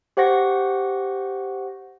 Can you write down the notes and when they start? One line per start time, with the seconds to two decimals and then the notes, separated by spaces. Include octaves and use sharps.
0.17 G4 C5 F#5 C#6 A#6